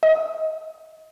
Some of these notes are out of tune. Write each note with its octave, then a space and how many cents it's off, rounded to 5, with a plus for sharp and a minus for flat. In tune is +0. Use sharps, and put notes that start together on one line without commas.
D#5 +25